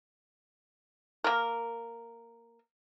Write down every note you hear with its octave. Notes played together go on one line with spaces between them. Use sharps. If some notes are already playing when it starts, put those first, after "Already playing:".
A#3 A#4